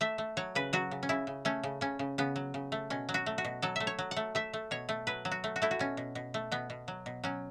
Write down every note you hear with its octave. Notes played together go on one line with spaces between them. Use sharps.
A3 E5
A3
F#3 C#5
C#3 B4
F#3 F#4
C#3
C#4
C#3 E4
C#3
A3 C#4
C#3
C#3 C#4
C#3
C#3 B3
F#3
C#3
A3
B2 C#4
F#3
F#4
A3
F#4
B2
F#3 A4
A3 E5
C#5
F#3
F#5
A3
A3 E5
A3
B2 C#5
A3
F#3 B4
F#3
F#4
A3
F#4
A3 E4
F#4
B2 C#4
B2
B2
A3
B2 B3
B2
F#3
B2
F#3 C#4